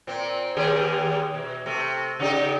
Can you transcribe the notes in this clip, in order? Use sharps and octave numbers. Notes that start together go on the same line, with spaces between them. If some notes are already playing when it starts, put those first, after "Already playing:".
A#2 C4
D#2 G4 G#4
B2
C3 A3
C#3 D#4 G4